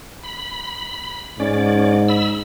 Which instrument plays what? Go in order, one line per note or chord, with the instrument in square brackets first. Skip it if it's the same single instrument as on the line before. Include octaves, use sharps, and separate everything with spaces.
[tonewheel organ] B5
[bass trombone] G#2 [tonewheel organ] C#4 D5
[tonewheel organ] B5 E6